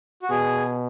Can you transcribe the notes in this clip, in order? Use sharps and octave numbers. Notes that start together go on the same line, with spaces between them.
F#4
B2 G#4